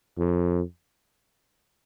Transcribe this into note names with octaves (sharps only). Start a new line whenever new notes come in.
F2